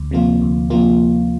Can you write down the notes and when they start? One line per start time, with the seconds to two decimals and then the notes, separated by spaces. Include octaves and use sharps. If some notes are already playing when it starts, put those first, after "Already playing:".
Already playing: D2
0.11 C3 F3 A#3 F4
0.41 D2
0.70 C3 F3 A#3 F4